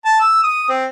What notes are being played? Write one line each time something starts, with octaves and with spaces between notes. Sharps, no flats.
A5
E6
D#6
C4